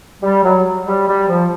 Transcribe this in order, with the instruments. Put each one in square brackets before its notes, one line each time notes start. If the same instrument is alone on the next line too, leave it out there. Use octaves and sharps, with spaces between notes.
[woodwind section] G3
F#3
G3
G3
F3